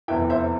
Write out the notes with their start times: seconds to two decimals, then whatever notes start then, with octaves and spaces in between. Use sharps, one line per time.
0.08 F1 E2 E3 E5 G5
0.30 C5 E5